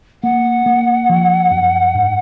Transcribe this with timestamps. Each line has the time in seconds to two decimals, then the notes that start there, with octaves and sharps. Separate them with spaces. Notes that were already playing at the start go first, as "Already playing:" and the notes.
0.23 A#3 F#5
0.66 A#3
1.09 F3
1.51 F#2
1.94 G#2